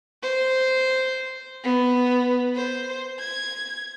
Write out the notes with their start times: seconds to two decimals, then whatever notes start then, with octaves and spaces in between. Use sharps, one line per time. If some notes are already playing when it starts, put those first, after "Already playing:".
0.23 C5
1.64 B3
2.55 C5
3.19 G#6